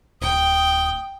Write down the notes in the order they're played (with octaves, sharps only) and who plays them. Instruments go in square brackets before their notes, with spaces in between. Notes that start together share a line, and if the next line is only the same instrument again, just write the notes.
[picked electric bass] D1 [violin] G5 [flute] D#6